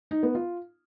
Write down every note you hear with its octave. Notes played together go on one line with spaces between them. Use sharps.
D#4
B3
F4